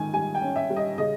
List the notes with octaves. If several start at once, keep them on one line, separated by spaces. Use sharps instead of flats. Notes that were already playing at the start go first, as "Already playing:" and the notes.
Already playing: G#2 D#3 G#5
G3 G#5
G5
C#4
E5
G3
D#5
C#3 D#5